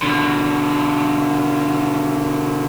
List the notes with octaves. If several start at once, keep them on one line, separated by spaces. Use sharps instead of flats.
B2 D3